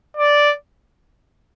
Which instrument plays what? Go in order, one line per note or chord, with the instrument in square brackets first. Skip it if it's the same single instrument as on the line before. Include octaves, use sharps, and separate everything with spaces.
[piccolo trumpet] D5